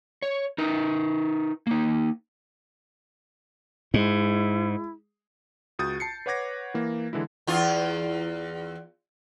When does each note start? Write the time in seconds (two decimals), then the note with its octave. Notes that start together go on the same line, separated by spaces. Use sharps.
0.22 C#5
0.58 D#4 A#4 B4
1.67 A#3 D#4
3.94 G#2 G#3 E4
5.79 C#2 F#4 D#6 G6 A6
6.00 A5 C7 C#7
6.26 B4 C#5 F#5 D6 G#6 A#6
6.74 E3 A#3
7.13 D3 E3 G#3 E4
7.47 E2 F4